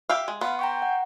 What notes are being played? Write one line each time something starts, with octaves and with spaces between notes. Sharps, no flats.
G4 E5 F5
G#3
B3 F5 C6
G5 A#5 C#6
F#5